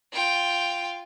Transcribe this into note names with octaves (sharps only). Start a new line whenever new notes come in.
F4 G5